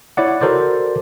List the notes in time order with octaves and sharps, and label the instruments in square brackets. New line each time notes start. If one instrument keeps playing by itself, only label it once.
[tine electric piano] E4 C#5 D5 F#5
F#4 A4 A#4 C5 D5